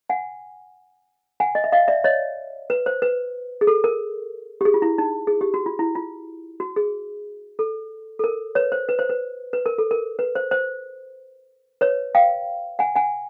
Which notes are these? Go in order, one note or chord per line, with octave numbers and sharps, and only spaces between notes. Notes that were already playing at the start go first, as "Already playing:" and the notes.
F#5 G#5
F#5 G#5
D#5
E5
D#5 F5
D5 E5
C#5 D#5
B4
C5
B4
G#4
A4
A#4
G4
G#4
F4
E4
D#4
G#4
G4
F#4
F4
E4
F4
F#4
G#4
A4
A4
A#4
B4 C#5
C5
B4
C5
B4
B4
A#4
A4
A#4
B4
C5
C5
B4 C#5
F5 G5
F#5 G#5
F#5 G#5